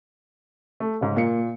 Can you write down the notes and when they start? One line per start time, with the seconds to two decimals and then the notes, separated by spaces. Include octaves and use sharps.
0.80 A3
1.01 G#2 C#3
1.16 A#2 A#3 C#7